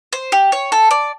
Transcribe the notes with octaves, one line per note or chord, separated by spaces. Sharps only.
C5
G4
C#5
A4
D5